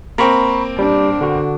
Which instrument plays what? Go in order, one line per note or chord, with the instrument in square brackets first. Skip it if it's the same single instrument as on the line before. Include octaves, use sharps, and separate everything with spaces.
[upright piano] A#3 C4 [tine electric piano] A#5 B5 C#6
[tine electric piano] G3 [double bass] D4
[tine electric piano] D3 F#4